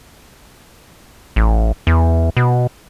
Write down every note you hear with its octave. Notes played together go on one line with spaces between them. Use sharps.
A1
E2
B2